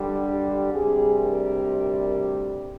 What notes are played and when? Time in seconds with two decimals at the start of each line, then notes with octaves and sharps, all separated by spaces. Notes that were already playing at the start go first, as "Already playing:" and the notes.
Already playing: G2 D3 G3
0.28 G4
0.73 D2 C3 G3 G#4
1.19 A#4